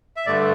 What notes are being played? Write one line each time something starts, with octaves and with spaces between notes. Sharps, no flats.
E5
G2 D3 A3 D5